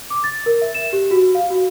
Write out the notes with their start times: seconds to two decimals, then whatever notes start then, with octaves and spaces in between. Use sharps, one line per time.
0.10 D6
0.24 A6
0.46 A#4
0.62 E5
0.74 E7
0.93 G4
1.11 F#4
1.35 F5
1.50 F#4